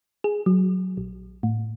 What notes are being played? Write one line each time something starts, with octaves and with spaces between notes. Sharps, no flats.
G#4
F#3
A#1
A2